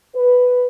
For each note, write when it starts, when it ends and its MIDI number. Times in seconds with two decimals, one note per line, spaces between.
0.15 0.66 71